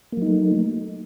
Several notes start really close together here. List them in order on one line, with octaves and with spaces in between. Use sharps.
A#3 F#3 D#4 A3